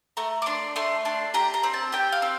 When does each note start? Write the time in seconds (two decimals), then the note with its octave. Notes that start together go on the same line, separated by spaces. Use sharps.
0.17 A3 A#5
0.42 D6
0.46 D4 C6
0.76 A3 C6
1.05 D4 C6
1.34 G4 A#5
1.54 A#5
1.63 C4
1.74 A5
1.92 G4 G5
2.12 F5
2.22 C4